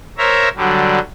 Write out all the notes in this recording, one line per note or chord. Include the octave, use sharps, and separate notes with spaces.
A#4 C5 C#5 E5 A#5
D3 F#3 G3